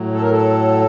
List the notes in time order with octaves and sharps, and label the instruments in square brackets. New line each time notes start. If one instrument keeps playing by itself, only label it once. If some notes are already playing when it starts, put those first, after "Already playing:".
Already playing: [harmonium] A2 F#3
A4
A#4
A4